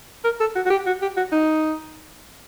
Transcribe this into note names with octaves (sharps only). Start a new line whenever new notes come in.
A#4
A4
F#4
F#4
G4
F#4
G4
F#4
D#4